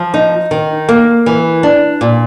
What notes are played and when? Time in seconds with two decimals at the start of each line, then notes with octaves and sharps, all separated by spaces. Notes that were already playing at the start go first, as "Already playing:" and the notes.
Already playing: F3
0.14 D#4
0.51 D#3
0.89 A#3
1.26 E3
1.63 D4
2.01 A#2